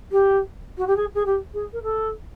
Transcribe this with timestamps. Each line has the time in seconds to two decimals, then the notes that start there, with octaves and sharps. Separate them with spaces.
0.12 G4
0.78 F#4
0.87 G4
0.97 G#4
1.15 G#4
1.26 G4
1.54 G#4
1.73 A#4
1.83 A4